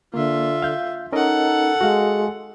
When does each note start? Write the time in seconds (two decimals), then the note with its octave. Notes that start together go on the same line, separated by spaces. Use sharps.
0.14 D3 A#3 F4 E5
0.62 F5 G6
1.13 C#4 D#4 A4 A#4 D#5 F#5
1.81 G#3 F#4 F5